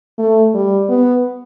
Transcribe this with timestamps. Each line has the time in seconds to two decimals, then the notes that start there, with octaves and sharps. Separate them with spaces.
0.18 A3
0.54 G3
0.89 B3